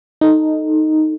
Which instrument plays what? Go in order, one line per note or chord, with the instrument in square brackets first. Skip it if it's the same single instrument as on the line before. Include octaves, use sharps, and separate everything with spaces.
[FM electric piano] D#4 A4